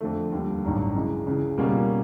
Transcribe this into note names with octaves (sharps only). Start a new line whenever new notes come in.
F2 D3 F3 A3
D#2 D3 G3
A1 G2 D#3 F#3
C#3 E3 G#3
C#2 C#3 E3
B2 G3 A#3 C#4 F4